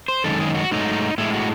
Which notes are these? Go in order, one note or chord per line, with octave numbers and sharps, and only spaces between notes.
C5
F#2 D#3 G#3 A4
G#4
F#4
G#2 F#3 A3 D#4
A2 G#3 E4
F#4